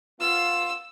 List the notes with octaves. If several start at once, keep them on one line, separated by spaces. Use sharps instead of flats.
B3 F4 E6